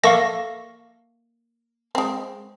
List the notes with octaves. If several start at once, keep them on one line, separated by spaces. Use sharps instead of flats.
A#3 A4 E5 F5 C#6 A#6
G#3 C4